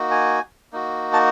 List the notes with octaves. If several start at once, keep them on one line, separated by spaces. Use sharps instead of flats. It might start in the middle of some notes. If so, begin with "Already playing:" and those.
Already playing: A#3 D#4 F#4
G#5
A#3 D#4 F#4
A5